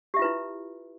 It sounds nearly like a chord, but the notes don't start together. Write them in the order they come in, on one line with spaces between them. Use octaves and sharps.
G4 E5 F4 B4 E4